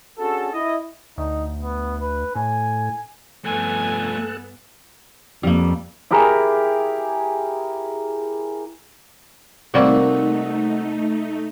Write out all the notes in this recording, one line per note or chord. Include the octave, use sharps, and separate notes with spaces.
C#4 D4 F#4 G#4 A4
E4 D#5
D2 D#4
B3
B4
A2 G#5
G2 F3 A3 B3 A4 G#5 F#6
F2 G3 A#3
E4 G4 G#4 A#4
C3 G3 A3 A#3 C4 D#4 F#4